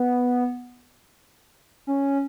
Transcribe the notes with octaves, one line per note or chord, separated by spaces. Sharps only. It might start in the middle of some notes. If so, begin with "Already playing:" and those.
Already playing: B3
C#4